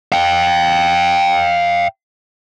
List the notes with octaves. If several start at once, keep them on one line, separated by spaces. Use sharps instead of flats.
F5 G5